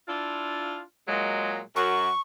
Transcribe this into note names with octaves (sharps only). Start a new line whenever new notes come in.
D4 E4 F4
A#2 F#3 G#3
F#2 F#4 C#6